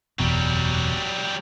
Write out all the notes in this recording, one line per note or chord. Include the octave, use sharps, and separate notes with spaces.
F#1 E2 B2 F#3 G3